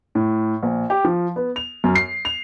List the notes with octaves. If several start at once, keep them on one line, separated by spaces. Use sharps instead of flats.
A2
A#1
G4
F3
B3
F7
F#2
C7
F7